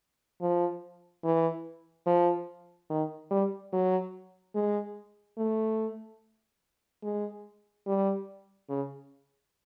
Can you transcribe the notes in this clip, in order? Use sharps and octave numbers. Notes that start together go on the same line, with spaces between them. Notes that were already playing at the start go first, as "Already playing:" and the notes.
F3
E3
F3
D#3
G3
F#3
G#3
A3
G#3
G3
C#3